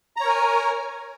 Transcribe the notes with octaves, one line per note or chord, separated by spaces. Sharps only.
A#4 C#5 G#5 A#5